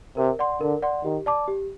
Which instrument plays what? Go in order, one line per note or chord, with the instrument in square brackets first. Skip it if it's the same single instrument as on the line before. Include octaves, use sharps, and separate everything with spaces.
[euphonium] C3 [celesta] A#4
[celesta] D5 F#5 C6
[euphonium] D3 [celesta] A#4
[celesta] D5 F#5 C6
[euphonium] D#3 [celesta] G4
[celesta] D5 A5 D6
G4